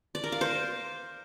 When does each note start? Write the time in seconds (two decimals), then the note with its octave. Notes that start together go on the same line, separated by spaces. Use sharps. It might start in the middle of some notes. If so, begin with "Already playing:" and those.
0.15 D5
0.24 A#4
0.32 F5
0.41 C5